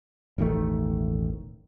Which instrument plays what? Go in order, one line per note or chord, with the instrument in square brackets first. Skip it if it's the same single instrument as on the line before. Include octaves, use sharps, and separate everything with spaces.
[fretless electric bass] E1 A1 D#3 A3